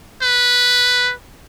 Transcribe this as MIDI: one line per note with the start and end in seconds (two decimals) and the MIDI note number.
0.22 1.12 71